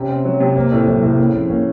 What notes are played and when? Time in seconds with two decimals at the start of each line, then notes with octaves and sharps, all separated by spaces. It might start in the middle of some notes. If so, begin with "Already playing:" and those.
Already playing: C3 C#4
0.09 C4
0.25 F#3
0.40 C3
0.56 A#3 C4
0.72 A2 C4
0.87 A2 F#3
1.03 A2 C3
1.18 C#3 A#3
1.34 F3 C4
1.49 A#3 C#4